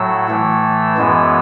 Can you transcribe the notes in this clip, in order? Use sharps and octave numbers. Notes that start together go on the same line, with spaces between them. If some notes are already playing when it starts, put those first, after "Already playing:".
Already playing: A2 F#3 E6
A2 E3 A3
F#2 E3 G#3 B3